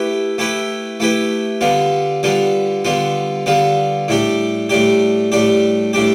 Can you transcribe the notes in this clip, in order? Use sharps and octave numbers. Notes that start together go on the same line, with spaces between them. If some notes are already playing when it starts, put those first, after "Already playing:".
Already playing: A3 E4 G4 B4
A3 E4 G4 B4
A3 E4 G4 B4
D3 G3 B3 F4
D3 G3 B3 F4
D3 G3 B3 F4
D3 G3 B3 F4
A2 G3 D4 G4
A2 G3 D4 G4
A2 G3 D4 G4
A2 G3 D4 G4